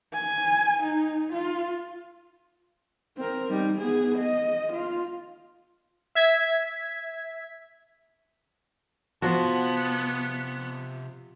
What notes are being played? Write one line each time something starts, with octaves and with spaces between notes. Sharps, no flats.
G#5
D#4
F4
C4 A#4
G3 D#4
B3 G#4
D#5
F4
E5 G#6 B6
C3 F3 B3 F#4 A5